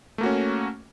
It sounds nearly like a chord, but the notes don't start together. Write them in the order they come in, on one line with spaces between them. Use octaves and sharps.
A3 A#3 F#4 C#4